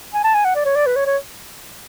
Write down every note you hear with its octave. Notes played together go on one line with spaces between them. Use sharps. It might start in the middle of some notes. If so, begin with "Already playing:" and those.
G#5
A5
G#5
F#5
D5
C#5
D5
B4
C#5
C#5